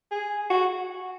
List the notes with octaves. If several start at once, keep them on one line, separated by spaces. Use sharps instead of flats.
G#4
F#4